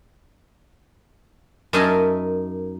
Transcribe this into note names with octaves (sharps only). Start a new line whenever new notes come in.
F#2 D#4 A#4 E5 G#5 A5